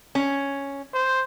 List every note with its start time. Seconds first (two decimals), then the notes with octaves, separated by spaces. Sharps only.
0.15 C#4
0.94 C5